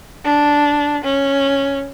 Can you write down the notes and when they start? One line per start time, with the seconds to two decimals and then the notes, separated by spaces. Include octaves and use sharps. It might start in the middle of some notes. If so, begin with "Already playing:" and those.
0.25 D4
1.04 C#4